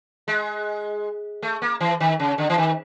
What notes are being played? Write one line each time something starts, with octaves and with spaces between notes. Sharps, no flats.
G#3
A3
A#3
E3
D#3
C#3
D3
E3
D#3